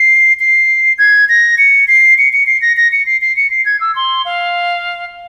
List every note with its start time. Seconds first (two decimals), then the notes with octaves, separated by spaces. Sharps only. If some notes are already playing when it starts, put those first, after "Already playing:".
Already playing: C7
0.39 C7
0.98 G#6
1.29 A#6
1.58 C#7
1.88 C7
2.18 C#7
2.33 C#7
2.46 C7
2.62 A#6
2.77 A#6
2.92 C#7
3.06 C7
3.21 C7
3.36 C#7
3.51 C7
3.66 G#6
3.81 E6
3.96 C6
4.25 F5